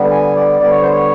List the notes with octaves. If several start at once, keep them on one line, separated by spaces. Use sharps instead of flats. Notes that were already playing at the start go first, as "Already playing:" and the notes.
Already playing: D3 G3 B3
G#5
D5
D3 G3 B3 D5
C#5
C5
C#5